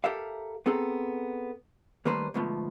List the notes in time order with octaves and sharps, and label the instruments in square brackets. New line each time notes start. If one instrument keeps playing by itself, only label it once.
[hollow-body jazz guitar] G4 A4 A#4 E5 F5
B3 C4 G#4 A4 A#5
D#3 G3 A3 A#3 B4 C5
D2 G#2 B2 F3 A3 B3